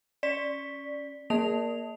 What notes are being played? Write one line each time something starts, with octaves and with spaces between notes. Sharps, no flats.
C#4 D5 B6
A#3 G#4 A#4 D5 F7